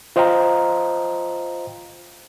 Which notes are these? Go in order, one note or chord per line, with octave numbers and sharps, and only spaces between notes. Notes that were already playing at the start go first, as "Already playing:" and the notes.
F4 C5 D#5 F5 G5 A#5